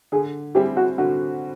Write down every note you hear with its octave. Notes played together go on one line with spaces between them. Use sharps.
D3 G#4
G3 C4 E4 G4 G#4
F#4
D3 F#4